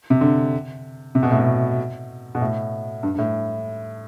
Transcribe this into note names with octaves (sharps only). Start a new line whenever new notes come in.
C3
D3
C3
B2
A2
B2
B2
A2
G2
G2
A2